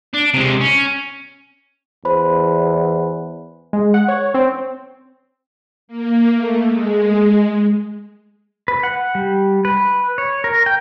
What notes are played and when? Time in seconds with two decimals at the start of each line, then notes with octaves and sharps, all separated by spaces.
0.14 D4
0.34 C3 G#3
0.61 C#4
2.05 E2 C5 B5
3.73 G#3
3.94 F#5
4.08 C#5
4.34 C4
5.88 A#3
6.35 A3
6.66 G#3
8.68 B4
8.83 F#5
9.15 G3
9.65 B4
10.18 C#5
10.44 A#4
10.66 G5